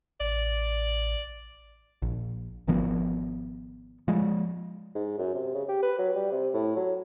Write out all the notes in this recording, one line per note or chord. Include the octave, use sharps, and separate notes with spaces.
A1 D5
A#1
G#1 D#3 F3 B3
F3 G#3
G#2
F#2
C3
C#3
G4
B4
F#3
G3
C3
A2
F#3